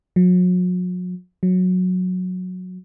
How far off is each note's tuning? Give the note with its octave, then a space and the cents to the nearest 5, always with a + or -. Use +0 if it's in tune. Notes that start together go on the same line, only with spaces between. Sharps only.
F#3 -40
F#3 -15